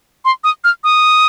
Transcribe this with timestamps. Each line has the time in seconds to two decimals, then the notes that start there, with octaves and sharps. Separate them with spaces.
0.25 C6
0.44 D#6
0.64 F6
0.84 D#6